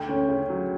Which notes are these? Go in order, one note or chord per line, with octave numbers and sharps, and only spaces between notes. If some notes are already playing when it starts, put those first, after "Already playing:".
Already playing: D2 G5
C#4
C#3
F#3